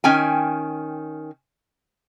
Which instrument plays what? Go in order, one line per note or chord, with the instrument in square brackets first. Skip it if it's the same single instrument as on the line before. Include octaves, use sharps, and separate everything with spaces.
[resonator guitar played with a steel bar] D#3 C#4 G5 G#5